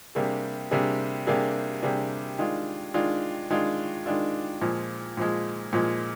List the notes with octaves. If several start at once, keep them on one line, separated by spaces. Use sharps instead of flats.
C3 G3 A#3 D4 G#4
C3 G3 A#3 D4 G#4
C3 G3 A#3 D4 G#4
C3 G3 A#3 D4 G#4
D#3 G#3 D4 F4
D#3 G#3 D4 F4
D#3 G#3 D4 F4
D#3 G#3 D4 F4
A#2 F3 G#3
A#2 F3 G#3
A#2 F3 G#3